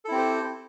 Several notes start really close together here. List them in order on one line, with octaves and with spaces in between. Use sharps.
A4 E4 C4 G4 C5